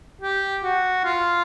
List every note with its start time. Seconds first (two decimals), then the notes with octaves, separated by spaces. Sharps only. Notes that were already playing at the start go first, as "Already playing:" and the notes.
0.21 G4
0.63 F#4
1.04 F4